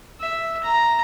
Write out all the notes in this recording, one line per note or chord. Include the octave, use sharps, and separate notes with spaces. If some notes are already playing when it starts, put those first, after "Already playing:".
E5
A#5